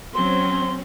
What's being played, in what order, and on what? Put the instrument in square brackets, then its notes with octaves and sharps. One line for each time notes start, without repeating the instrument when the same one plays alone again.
[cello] F#3 [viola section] C4 C#4 [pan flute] C6